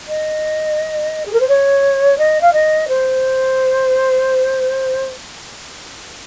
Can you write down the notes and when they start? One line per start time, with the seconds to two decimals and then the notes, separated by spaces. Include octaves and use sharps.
0.08 D#5
1.26 G#4
1.33 A#4
1.40 C5
1.48 C#5
2.18 D#5
2.41 F5
2.53 D#5
2.88 C5